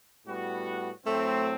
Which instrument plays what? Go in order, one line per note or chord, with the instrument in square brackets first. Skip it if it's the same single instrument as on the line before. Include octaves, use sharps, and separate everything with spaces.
[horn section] A2 G3 B3 F#4
[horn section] A2 F#3 C4 [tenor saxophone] A3